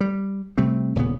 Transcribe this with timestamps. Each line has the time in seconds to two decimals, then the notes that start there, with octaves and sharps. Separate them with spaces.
0.01 G3
0.58 C3 G3 A3 C4
0.95 D#1 A#2 C#3 B3